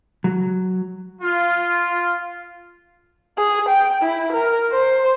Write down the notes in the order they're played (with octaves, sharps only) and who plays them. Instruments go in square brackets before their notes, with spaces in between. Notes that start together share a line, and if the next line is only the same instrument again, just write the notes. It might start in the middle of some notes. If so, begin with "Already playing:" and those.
[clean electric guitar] F#3
[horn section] F4
[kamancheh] G#4
G5
E4
A#4
C5